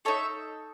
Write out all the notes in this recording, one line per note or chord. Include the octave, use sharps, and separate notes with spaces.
D#4 A4 C#5 E5